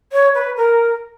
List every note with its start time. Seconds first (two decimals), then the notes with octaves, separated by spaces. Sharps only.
0.12 C#5
0.34 B4
0.56 A#4